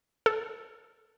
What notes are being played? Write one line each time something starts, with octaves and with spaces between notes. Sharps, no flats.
A4